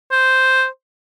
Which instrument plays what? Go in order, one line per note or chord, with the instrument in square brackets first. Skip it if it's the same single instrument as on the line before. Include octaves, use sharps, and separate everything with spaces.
[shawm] C5